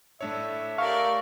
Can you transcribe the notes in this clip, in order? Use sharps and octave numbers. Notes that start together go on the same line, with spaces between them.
A2 A3 D4 C#5 E5
G4 A#4 D5 F5 C#6